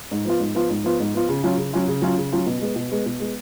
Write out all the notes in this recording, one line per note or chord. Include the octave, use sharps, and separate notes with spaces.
G#2
F3 B3 F4
G#2
F3 B3 F4
G#2
F3 B3 F4
G#2
F3 B3 F4
C#3
F#3 C#4 F4
C#3
F#3 C#4 F4
C#3
F#3 C#4 F4
C#3
F#3 C#4 F4
B2
G#3 B3
B2
G#3 B3
B2
G#3 B3